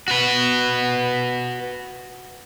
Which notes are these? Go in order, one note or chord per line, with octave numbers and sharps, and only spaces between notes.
F#4 B4